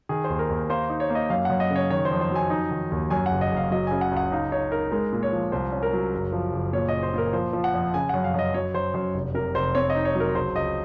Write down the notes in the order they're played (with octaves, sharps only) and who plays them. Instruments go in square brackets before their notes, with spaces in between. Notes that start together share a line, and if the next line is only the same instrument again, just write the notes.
[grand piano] D#3 G#4
C5
D#2
A#4
D#2
A#3 C5
D#4
C#5
A#3
D#5
F#2 F5
F#2 F#5
D#5
C#3
C#5
D#3 C#5
C5
F2
C5
F#3 G#5
D#4
D#3
D#2
F#2 G#5
F#5
F#1
D#5
F#1
F5
F#3 D#5
C#3 G#5
F#5
C#2
F#5
D#4 F5
D#4 C#5
D#4 A#4
G#3 A#4
A#2
C#5
F3
C2 C5
C#4
A#4
F#3
F#1
F3
F#1
A#2 C#5
C#4 D#5
C5
A#2 A#4
F3 C5
F3
F#5
F2
C#3 G#5
F#2 F#5
F5
F#2 D#5
F#3 C#5
F#2 C5
F#2 C5
F1
C3 A#4
F1 C5
C4 C#5
D#5
D#4
C#5
F#3
A#4
C#2 C5
C#2 D#5